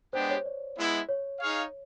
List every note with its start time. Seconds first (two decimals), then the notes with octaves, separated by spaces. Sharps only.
0.13 G#3 B3 D4 G4 C5
0.30 C#5
0.46 D5
0.77 G#3 B3 E4
1.09 C#5
1.40 D#4 G#4 C#5 F5